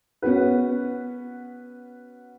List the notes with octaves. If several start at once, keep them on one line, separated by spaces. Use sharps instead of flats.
B3 C#4 F#4 B4